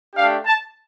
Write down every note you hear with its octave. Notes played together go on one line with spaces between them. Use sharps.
A3 D4 G4 F5
A5